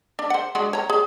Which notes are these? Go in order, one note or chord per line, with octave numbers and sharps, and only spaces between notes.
D4
C5 F#5
G#3 D4 F#4
C#5 A#5
G#4